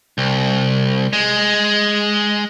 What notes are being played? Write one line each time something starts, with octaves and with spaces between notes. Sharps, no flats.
C2
G#3